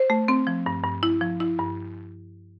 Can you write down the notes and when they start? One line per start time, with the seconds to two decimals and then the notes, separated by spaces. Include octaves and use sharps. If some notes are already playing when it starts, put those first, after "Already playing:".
Already playing: C5
0.10 A3
0.28 C4
0.47 F3
0.66 G2
0.84 G2
1.03 E4
1.21 F3
1.40 E4
1.59 G2